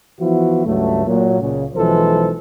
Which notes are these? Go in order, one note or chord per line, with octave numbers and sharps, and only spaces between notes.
E3 F3 B3 E4 F#4
C#2 G2 F#3 A3
A#2 F#3
C#2 A#2 C#3
B1 E3 F3 G#3 A4 C5